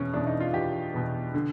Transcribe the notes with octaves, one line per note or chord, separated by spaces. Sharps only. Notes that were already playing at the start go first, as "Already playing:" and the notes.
Already playing: E2 B2 C#4
E2 B2 D4
D#4
F4
E2 B2 G4
E2 B2
D3